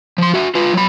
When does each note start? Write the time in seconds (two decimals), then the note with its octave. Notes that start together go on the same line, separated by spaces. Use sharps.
0.18 F3 C6
0.34 F#4 E5
0.55 F4 B4
0.74 F#3 B5